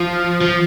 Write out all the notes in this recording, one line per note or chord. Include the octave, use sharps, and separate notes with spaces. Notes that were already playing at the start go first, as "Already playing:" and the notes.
Already playing: F3
F3